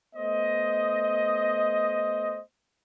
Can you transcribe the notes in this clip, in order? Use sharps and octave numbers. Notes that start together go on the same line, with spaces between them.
A3 B3 C5 D#5